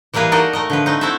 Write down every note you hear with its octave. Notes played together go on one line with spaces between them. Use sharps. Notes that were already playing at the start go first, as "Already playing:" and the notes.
E3 G3 A#3 G#4 B4
D#4 F#4 A4 A#4 D5 D#5
A3 A#4 D#5
D3 F3 B4
A3 C4 D#4
C4 E4 F#4 A4 E5